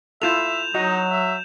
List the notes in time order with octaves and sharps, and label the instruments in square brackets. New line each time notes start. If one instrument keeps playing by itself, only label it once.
[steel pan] E4 F4 A4 [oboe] E5 [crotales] G6 E7 F7
[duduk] F#3 [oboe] D#4 [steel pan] F#4 D#5
[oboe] E5